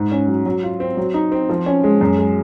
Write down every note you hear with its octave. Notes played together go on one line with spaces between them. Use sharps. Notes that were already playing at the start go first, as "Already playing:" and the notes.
Already playing: G#2
C#4
F#3
F#3
F4
C4
F#3
D#4
C4
F3
C#4
G#3
F#2
G#3